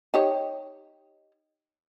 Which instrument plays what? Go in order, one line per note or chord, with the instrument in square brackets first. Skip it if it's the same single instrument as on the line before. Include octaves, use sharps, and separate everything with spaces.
[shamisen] D#4 G4 C#5